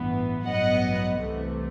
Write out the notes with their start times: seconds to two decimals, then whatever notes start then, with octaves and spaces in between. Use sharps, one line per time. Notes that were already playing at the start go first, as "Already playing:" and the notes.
Already playing: A1 G2 E3 B3
0.46 A1 G2 F#3 B3 D#5 F#5
1.21 C2 C3 E3 A3